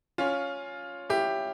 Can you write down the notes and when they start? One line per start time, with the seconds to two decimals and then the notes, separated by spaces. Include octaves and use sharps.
0.18 C#4 F4
1.10 E4 G4